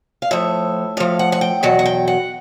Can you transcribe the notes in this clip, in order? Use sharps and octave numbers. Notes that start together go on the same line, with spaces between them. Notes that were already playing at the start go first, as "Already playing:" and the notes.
F5
A2 F3 E5
A2 F3 F5
F#5
F#5
G5
E2 B2 F#3 F#5
F#5
G5
F#5